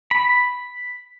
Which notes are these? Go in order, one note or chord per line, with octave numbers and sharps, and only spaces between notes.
B5